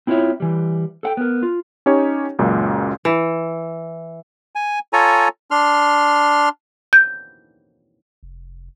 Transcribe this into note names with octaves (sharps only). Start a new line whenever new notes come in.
C4 E4 F4 C5 C#5 E5
E3 G3
A4 F#5 G5
B3 A#4
F4
C#4 D#4 G4 C#5
C#2 F#2 A#2
E3
G#5
F4 A4 C#5 G#5 A#5
D4 C6 F6
G6
F1